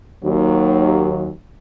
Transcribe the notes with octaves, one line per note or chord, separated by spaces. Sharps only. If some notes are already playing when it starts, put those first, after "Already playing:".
D#2 F#3